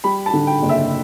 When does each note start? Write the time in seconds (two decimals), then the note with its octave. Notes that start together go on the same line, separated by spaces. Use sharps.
0.04 G3 B5
0.26 A5
0.33 D3
0.47 G5
0.62 F#1
0.69 E5